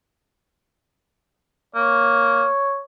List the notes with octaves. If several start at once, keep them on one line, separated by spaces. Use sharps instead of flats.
A#3 C#5